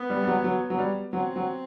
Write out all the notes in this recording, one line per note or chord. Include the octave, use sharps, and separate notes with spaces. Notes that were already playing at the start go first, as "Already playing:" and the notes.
Already playing: B3
G3
G3
F#3
F#3
F#3
G3
F#3 C4
F#3